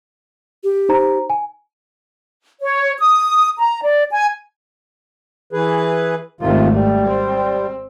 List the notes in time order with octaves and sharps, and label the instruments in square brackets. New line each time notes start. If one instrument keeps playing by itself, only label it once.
[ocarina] G4
[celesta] D#4 C5 A#5
G#5
[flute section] C#5
D#6
A#5
D5
G#5
[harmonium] E3 G#4 B4
[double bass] G#1 A3 [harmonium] C3 D#3 F4
[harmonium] G3
[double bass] C4